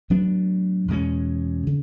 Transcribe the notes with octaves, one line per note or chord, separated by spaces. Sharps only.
A2 F#3 B3 D4
E2 B2 G#3 C#4
C#3